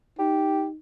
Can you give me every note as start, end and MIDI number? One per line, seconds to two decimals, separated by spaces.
0.19 0.78 63
0.19 0.66 67